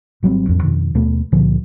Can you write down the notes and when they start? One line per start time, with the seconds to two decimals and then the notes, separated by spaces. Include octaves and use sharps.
0.23 G#1 F#3 G3 C4
0.47 A1 F2 D4
0.63 F2 B2 D#3
0.94 D#2 B2 A3 B3
1.32 C#2 A#2 D3 F3